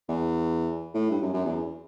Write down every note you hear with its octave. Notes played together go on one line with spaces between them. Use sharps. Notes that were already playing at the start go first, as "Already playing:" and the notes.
E2
A2
G2
F#2
F#2
E2